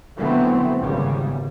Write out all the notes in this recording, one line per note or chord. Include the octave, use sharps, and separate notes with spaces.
D3 E3 F#3 A3 B3 C4
G#1 E2 C#3 G3